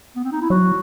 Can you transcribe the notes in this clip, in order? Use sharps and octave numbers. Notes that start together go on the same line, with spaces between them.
B3
C4
D#4
E4
F#3 F#4